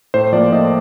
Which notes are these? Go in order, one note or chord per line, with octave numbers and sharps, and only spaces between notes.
A2 C5
F3 A#3 D5
A2 D#5